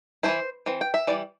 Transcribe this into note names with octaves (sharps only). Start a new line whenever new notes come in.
E3 A3 E4 C5
E3 C4
G5
E5
E3 G3 E4 D5